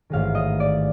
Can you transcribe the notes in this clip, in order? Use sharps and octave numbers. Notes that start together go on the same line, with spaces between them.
A1 G#2 D#3 G#3 F5
D#5
D5